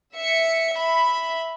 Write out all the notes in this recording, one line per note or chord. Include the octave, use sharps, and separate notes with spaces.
E5 C#7
E5 B5